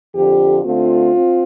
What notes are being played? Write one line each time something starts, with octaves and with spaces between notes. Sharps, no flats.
F2 D3 F3 G4
D3 A3 C4 F4
C4